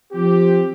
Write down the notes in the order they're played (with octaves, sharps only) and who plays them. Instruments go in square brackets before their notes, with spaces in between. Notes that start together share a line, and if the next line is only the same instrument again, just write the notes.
[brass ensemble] F3 C4 G4